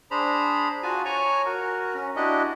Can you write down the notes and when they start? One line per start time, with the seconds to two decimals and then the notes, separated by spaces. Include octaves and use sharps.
0.11 D4 G#4 C5 A#5 B5
0.83 F4 F#4 G#5 A5
1.05 C#5 G#5 A#5 C#6
1.45 F#4 A#4
1.94 C#4
2.16 D4 E4 F#4 G4 D#5